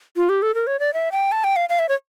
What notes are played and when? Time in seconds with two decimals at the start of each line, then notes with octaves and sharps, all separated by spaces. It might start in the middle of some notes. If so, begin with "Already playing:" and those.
0.17 F4
0.29 G4
0.42 A4
0.54 A#4
0.67 C#5
0.80 D5
0.94 E5
1.12 G5
1.32 A5
1.44 G5
1.56 F5
1.69 F5
1.79 E5
1.89 C#5